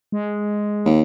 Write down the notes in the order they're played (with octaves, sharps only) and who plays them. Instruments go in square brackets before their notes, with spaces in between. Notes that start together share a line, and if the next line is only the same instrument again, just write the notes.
[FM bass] G#3
[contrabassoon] D#2